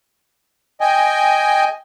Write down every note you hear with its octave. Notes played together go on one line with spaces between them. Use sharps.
D#5 G5 G#5